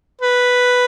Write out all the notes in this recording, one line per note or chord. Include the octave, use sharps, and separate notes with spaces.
B4